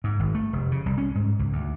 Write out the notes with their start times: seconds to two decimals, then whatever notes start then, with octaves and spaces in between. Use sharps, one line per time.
0.04 G#2
0.20 G#1
0.35 A3
0.53 F1
0.72 C#3
0.86 C2
0.98 C#4
1.15 G#2
1.39 C#2
1.53 D2